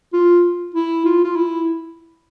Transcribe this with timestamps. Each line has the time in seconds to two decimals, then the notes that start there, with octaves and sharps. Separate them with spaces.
0.13 F4
0.74 E4
1.06 F4
1.24 F4
1.36 E4